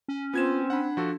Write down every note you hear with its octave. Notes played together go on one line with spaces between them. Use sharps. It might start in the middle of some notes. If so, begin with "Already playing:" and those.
C#4
B3 C4 F4 G#6 E7
D4 F#5 B5
F3 F#4 A4